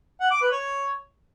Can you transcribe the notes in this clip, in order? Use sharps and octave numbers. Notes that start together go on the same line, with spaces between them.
F#5
D6
B4
C#5